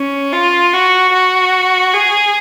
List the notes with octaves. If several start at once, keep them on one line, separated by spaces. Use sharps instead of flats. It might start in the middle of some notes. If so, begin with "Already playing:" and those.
Already playing: C#4
F4
F#4
F#4
G#4